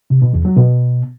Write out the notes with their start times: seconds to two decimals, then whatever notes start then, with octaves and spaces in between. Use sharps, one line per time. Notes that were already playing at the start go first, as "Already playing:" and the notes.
0.10 C3
0.22 B2
0.33 E2
0.45 F#3
0.56 B2